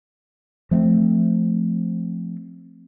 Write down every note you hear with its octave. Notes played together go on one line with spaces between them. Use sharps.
F3 A3 B3 C4